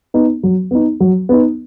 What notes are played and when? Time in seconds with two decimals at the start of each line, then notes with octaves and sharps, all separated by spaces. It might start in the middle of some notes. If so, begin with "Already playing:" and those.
0.14 B3 D#4
0.43 F#3
0.71 B3 D#4
1.00 F#3
1.29 B3 D#4